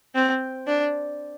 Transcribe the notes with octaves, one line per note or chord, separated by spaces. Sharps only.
C4
D4